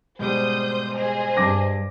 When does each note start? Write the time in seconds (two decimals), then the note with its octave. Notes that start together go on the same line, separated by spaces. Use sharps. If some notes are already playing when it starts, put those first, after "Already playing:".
0.19 G#2 B2 G3 C5 D#6 G6
0.95 G#4 C5 D#5
1.37 G2 D6 A#6